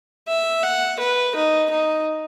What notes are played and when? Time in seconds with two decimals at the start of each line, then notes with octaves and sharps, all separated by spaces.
0.28 E5
0.64 F#5
1.00 B4
1.36 D#4
1.70 D#4